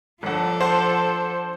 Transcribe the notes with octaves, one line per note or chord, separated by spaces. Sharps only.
G1 F3 D4 A4 F#5
C5 F#5 A5